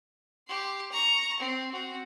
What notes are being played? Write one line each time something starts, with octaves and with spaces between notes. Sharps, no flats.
G4 C6
A#5 C#6
C4
C4 F#4